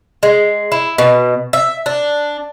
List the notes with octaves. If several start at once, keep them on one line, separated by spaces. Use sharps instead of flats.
G#3
E4
B2
E5
D4